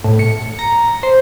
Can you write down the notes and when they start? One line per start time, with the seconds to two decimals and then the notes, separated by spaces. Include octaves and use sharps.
0.04 A2
0.19 C#7
0.59 A#5
1.03 C5